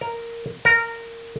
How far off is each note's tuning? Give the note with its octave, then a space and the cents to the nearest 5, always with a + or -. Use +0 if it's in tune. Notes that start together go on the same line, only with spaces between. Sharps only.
A#4 -5
A#4 -15